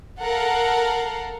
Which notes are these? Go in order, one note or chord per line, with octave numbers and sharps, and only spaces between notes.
A4 A#4 F5 F#5